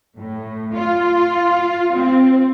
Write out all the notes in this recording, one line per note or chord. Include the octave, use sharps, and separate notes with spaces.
A2
F4
C4